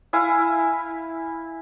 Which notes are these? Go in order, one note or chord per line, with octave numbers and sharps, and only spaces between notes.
E4 F5 G#5